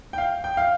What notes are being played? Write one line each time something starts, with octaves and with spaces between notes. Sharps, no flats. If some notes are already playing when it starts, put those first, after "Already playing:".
G5
F5
G5
F5